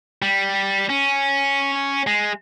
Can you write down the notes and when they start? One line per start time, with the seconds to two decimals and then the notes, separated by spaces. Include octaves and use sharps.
0.22 G3
0.90 C#4
2.07 G#3